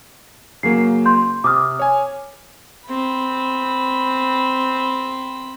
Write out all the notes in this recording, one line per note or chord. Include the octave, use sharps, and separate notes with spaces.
C#3 F#3 A#3 C7
C6 G6
C3 D6 D#6 F6
C#5 G#5
C4 B5